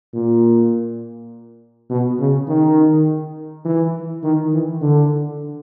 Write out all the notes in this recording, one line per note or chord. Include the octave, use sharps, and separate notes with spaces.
A#2
B2
C#3
D#3
E3
D#3
E3
D3